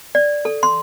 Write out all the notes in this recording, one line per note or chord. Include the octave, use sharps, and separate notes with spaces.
D5
A4
C6